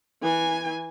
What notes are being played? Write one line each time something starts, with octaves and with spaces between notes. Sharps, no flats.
E3 G#5